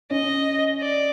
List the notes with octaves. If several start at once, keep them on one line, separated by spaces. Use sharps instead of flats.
C#4 D#5
D5